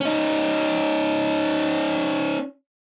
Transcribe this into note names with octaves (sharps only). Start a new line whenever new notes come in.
C#4 D#4